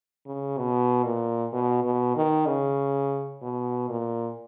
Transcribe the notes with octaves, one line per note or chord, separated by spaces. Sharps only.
C#3
B2
A#2
B2
B2
D#3
C#3
B2
A#2